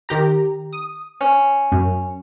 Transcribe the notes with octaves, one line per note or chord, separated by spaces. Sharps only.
D#3 G4 A#5
D#6
C#4
F#2